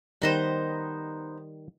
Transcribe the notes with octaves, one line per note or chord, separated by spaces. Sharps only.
D#3 G3 B3 D#4 C5